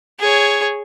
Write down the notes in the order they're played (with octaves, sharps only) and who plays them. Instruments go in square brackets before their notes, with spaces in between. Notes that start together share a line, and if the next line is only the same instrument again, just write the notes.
[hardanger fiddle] G#4 C#5